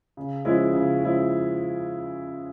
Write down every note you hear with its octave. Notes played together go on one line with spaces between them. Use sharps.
C#3
F3 G#3 C#4 E4
C#3
F3 G#3 C#4 E4